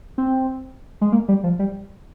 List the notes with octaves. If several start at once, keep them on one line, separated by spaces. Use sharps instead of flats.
C4
G#3
A#3
G3
F3
G3